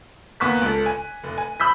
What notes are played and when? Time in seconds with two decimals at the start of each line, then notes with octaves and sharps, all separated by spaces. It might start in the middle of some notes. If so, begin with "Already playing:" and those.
0.40 D#2 B3 C#6 F#6 B6
0.62 C#2 A4
0.86 G#5
1.24 F1
1.38 G#5
1.60 B5 E6 G6 B6